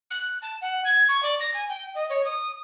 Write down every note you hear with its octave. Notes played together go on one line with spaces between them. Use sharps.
F#6
A5
F#5
G#6
C#6
D5
A#6
G#5
G5
D#5
C#5
D#6